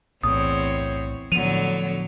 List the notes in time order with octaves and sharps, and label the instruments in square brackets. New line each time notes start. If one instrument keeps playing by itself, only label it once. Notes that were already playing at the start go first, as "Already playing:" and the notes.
[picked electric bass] B1 A2 [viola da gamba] E2 C4 C#5 [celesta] D#6
[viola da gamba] A2 D3 F#3 [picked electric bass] F3 B3 [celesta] D#7 F7